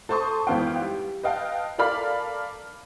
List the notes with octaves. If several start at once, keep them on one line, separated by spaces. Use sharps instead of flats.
A4 C5 A5 C6 C#6 D#6
G#1 E3 B3 C5 F5 G5
G3
B4 D#5 F5 G5 A5
A4 A#4 D5 F5 B5 F6